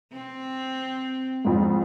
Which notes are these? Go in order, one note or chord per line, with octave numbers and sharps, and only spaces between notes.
C4
F2 G#2